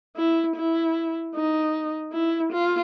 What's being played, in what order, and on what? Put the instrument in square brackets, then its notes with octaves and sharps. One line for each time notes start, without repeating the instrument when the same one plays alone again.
[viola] E4
E4
D#4
E4
F4